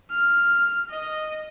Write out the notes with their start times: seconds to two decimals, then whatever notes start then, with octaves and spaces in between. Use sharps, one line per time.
0.11 F6
0.90 D#5